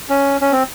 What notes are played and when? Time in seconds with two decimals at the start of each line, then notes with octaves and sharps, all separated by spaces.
0.09 C#4
0.41 C#4
0.52 C4